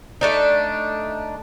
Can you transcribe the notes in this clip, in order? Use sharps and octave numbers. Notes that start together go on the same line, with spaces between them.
A3 D4 D#4